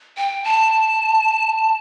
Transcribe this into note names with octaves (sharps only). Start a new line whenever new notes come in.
G5
A5